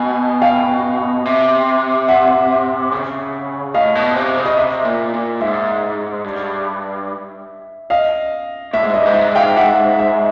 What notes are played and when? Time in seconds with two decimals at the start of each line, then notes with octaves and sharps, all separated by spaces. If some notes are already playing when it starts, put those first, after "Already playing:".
Already playing: B2 G#5
0.42 F5 G5
1.25 C3
2.08 E5 F#5
2.92 C#3
3.74 A2 D#5 F5
3.95 B2
4.16 C3
4.37 C#3
4.46 D#5
4.57 C3 E5
4.85 A#2
5.14 A#2
5.40 G#2 E5
6.24 G2
7.90 D#5 F5
8.73 A2 E5
8.84 G#2
8.94 G2 D#5
9.06 G#2
9.15 E5
9.35 F5 G5
9.56 E5 F#5
9.99 E5